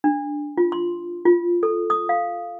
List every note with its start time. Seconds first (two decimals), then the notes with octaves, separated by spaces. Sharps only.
0.04 D4
0.58 F4
0.72 C6
1.25 F4
1.63 A4
1.90 D#6
2.09 F5